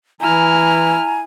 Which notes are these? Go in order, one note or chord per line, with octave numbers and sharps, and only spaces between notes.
E3 E4 G#5 A#5 F6